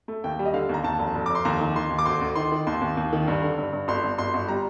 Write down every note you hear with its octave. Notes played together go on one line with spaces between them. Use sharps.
A3
D#2 G5
G3
D#5
D3 F5
D#2 A#5
D#2 A5
F1
F1
F1 D6
C6
D#2 A#5
D#3
D#3 C6
D#2
D6
D2 C6
D2
D#3 C6
D#3
D#2 C6
D#2
D#2
D#3
G2
D3
G2
G2
G1 C6
G2
G1 C6
G1
G3 A#5